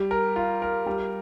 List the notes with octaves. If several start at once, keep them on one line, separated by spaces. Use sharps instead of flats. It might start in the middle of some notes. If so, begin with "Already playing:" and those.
Already playing: G3
A#4
F4
A#4
G3